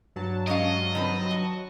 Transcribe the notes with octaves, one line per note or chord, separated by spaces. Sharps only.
G2 F#3 A5
G#3 C#4 D#5 F5
D#3 C4 B4
F#4